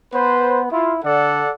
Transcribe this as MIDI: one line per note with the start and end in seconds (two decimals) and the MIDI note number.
0.14 0.68 59
0.14 0.62 71
0.14 0.62 72
0.72 1.01 64
0.72 0.92 65
1.04 1.44 50
1.04 1.50 69
1.04 1.50 74
1.04 1.50 78